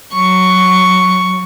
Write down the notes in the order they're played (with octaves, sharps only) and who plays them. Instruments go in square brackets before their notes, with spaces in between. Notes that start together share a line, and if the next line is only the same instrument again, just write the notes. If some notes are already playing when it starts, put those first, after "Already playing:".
[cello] F#3 [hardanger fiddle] C#6